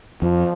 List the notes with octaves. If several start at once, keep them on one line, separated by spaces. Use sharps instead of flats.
F2 F3